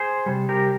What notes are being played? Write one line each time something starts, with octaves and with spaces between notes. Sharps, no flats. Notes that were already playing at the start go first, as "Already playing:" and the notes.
Already playing: G#4 C5
C3 G3
G4 A#4